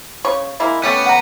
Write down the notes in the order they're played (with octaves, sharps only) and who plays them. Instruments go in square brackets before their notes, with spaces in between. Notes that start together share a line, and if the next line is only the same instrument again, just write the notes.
[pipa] C#3 C#5 C#6
G#3 A#3 E4
[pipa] A3 C#4 G4 [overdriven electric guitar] B3
[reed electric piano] F#5 A#5